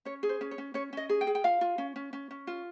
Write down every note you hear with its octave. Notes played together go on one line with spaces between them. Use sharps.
C#4 C#5
G#4
C5
C#4
C#5
C#4
C#4 C#5
C#4 D#5
G#4
G5
G#4
G5
F4 F5
F4
C#4
C#4
C#4
C#4
F4